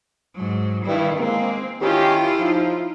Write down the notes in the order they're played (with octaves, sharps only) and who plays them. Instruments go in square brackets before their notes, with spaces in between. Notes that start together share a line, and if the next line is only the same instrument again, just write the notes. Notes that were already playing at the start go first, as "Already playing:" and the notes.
[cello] G#2 F#3
[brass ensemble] G2 [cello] D#3 E4
[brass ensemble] G#3 A#3 [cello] C4
[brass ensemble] D#3 C#4 G4 [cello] E4 F4
[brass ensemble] F3 D#4